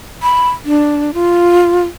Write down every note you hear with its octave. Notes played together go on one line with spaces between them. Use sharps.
B5
D4
F4